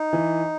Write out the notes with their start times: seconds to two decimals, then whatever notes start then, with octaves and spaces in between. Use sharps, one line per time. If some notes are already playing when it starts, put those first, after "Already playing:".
Already playing: D#4
0.13 E3